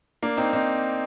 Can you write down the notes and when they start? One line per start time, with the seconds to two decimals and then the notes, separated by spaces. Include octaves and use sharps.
0.23 A#3 D4
0.37 C4 D#4
0.53 C4 D#4